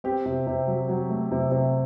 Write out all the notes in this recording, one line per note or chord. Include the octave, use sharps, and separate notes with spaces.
C4 G4
C3
C3
F#3
F#3
A3
C3
C3